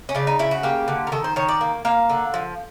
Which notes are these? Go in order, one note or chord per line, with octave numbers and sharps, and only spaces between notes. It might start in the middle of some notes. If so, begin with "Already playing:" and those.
C#4
C#3 D4
D#4
C#3 E4
F#4
A#3 G4
D3
A#4
D#3 A4
C5
D#3 C#5
D5
A#3
A#3 F5
D3
F3